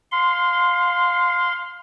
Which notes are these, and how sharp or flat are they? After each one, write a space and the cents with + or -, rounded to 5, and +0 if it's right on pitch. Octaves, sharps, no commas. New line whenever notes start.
F5 +20 C6 -15